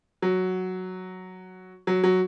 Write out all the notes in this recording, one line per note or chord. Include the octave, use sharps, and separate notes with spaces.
F#3
F#3
F#3